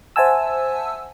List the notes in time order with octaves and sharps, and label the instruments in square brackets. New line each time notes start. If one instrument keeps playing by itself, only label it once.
[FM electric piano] C5 E5 F#5 G#5 A5 E6